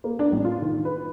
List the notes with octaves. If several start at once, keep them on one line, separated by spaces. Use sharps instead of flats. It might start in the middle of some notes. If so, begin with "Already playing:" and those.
A#3
D4
A1
F4
D#3
B4